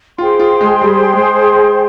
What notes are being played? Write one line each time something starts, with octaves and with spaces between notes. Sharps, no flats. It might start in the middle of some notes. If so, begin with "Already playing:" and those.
F4 G#4 C5 G5 C6
F4
G#3
G3
G#3